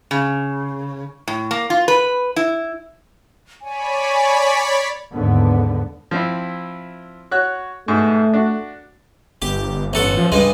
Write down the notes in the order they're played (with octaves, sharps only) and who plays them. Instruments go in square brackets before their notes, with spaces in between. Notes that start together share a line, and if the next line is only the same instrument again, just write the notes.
[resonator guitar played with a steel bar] C#3
A2
A#3
F4
B4
E4
[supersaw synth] C#5 D5 B5 [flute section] G#5
[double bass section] D#2 G#2 D3 B3
[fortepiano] F3 C4 E4
F#4 C#5 F#6
[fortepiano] G#2 B2 [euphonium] A3
[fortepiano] D4 F#4
[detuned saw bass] G1 [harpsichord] G4
[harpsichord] A1 A4 F#5
[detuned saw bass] F3
[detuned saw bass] C#2 [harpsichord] G2 G#3